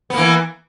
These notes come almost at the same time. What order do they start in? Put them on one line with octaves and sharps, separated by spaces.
B3 A#3 E3